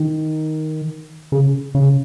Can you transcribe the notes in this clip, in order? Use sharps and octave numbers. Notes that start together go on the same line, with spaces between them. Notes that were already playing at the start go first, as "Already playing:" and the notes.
Already playing: D#3
C#3
C#3